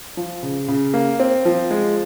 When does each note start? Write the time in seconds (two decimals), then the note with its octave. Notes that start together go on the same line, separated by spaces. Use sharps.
0.17 F3
0.43 C#3
0.68 C#3
0.94 A#3
1.20 C4
1.45 F3
1.71 G#3